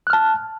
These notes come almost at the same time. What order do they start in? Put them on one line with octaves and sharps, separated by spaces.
F#6 F6 A5